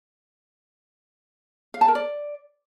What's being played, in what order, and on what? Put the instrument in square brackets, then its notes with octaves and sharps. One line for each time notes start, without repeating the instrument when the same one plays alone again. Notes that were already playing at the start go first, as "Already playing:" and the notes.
[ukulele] F5
A5
A#4
D5